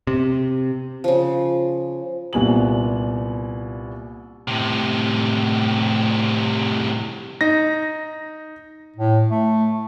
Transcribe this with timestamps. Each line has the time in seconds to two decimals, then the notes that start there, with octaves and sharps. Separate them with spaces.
0.07 C3
1.04 C#3 F3
2.33 C2 A#2 B3 G#5 F#7
4.48 A2 C3
7.41 D#4 A#6
8.96 A2
9.31 A3